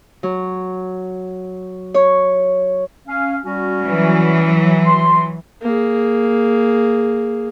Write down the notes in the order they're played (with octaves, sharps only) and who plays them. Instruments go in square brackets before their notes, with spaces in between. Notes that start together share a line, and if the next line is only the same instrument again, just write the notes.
[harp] F#3
C#5
[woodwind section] C#4 F5
G3 C#4 F#4
[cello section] E3 F#3
[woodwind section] C6
[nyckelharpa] A#3 G#4